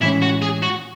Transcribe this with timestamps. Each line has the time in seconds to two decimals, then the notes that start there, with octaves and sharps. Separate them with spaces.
0.01 A2 E3 G#3 C#4 E4
0.22 F#4
0.42 G#4
0.63 F#4